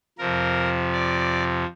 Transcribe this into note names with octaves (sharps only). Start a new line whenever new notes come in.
F2 C3 F3 A#4
D5